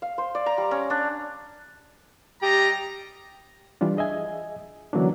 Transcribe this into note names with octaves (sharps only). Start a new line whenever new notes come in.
F5
C5
D5
A#5
G3
C#4
D4
G3 G4 D#5 A#5
E3 G3 D4 F4
G#4 D#5 E5 G#5
D3 E3 F#3 A#3 C#4 D4